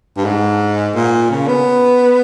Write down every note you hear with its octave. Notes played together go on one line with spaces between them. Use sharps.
G2
G#2
A#2
C#3
B3